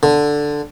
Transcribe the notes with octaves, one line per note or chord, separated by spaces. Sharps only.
D3